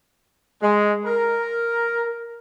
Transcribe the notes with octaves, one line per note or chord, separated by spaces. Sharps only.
G#3
A#4